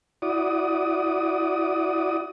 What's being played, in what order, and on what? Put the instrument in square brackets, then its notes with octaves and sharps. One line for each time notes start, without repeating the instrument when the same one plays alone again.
[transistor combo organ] E4 F#4 D5 D#6